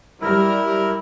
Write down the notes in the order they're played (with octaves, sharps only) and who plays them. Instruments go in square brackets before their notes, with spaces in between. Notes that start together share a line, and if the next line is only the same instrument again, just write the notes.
[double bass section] G3 [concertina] E4 [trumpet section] A#4